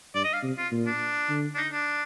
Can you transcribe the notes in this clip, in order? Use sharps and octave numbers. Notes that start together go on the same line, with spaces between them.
G2 D5
D#5
F5
C3
F4
A#2
D4
D3
D4
D#4
D4